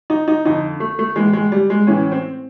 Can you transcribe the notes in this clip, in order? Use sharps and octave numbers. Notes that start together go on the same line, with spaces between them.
D#4
D#4
F2 D3 D#4
A3
A3
A2 E3 G#3
G#3
G3
G#3
A2 E3 C#4
C4